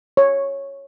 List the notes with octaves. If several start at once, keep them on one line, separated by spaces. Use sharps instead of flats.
C#5